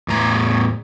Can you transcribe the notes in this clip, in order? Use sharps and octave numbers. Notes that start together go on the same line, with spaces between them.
E2 A2 A#5